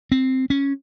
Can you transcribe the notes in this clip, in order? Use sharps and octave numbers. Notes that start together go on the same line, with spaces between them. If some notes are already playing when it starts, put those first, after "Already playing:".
C4
C#4